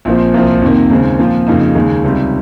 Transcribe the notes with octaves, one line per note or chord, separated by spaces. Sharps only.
A#1 A#2 F3 C4
C2 A#2 F3 C4
F2 C3 D#3 A#3
D#2 C#3 G#3 C4
A#2 F3 C4 F4
F2 C#3 F3 A#3 D#4
D#2 C#3 G#3
C#2 C3 D#3 G3